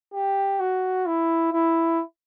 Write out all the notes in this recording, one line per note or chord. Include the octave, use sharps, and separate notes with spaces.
G4
F#4
E4
E4